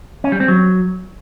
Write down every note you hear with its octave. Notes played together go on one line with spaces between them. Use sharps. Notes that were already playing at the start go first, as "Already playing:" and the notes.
C#4
G3
C4
F#3